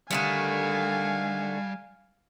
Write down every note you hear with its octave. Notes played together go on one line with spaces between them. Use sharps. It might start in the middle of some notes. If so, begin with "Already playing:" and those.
D3 D#3 G3 A3 F5 G#5